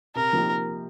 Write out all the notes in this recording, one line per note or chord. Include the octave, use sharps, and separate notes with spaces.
C3 A#4
F3 A#3 D#4 G4